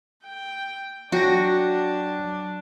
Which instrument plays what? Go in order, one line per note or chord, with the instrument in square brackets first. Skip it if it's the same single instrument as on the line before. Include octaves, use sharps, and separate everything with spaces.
[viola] G5
[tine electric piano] F#3 G5 A#6 [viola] D4 [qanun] F#4